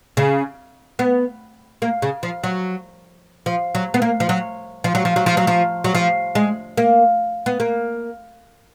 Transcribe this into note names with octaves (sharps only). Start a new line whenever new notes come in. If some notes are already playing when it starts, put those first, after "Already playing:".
C#3
B3
A#3
C#3
F3
F#3
F3
F#3
B3
A#3
F3
F#3
F3
F#3
F3
F#3
F3
F#3
F3
F#3
F3
G#3
A#3
B3
A#3